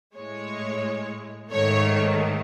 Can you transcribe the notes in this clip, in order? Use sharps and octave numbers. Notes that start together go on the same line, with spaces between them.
A2 G#3 C#5
G#2 D#3 A3 C#5